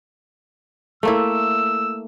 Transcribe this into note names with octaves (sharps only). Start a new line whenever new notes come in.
A3 A#3 E4 E6